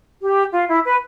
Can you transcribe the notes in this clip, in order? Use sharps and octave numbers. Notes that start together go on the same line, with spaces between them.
G4
F4
E4
B4